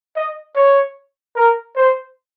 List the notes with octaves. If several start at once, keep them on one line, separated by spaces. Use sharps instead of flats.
D#5
C#5
A#4
C5